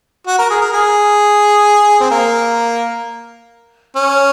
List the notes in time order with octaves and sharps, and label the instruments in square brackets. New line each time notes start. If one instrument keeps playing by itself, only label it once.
[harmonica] F#4
A#4
G#4
A#4
G#4
C4
A#3
C#4